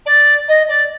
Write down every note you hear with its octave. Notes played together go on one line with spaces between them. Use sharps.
D5
D#5
D5